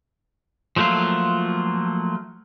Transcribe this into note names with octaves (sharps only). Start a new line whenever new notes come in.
F3 F#3 A3 A#3 F4